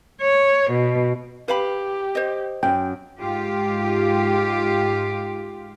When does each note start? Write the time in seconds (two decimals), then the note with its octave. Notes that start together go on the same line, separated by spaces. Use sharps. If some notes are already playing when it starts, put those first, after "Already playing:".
0.21 C#5
0.71 B2
1.48 G4 B4 F5 B5
2.15 C5 D#5
2.63 F#2 G5
3.21 G#2 F4 G4